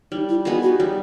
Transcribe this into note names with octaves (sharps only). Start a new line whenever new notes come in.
G3 D#4
E4
B3 D#4 F4 G#4
F#4
G3